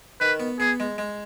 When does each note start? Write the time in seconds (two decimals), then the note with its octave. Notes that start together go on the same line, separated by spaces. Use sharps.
0.21 D#3 B4
0.40 B3
0.60 B3 G#4
0.80 G#3
0.98 G#3